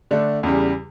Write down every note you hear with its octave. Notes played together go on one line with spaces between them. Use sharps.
D3 A3 D4
E2 C#3 G3